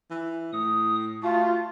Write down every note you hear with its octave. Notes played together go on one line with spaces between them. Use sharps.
E3
A2 D#6
A3 F4 F#4